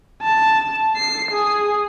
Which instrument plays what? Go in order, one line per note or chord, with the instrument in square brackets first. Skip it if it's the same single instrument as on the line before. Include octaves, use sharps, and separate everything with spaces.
[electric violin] A5
C7
G#4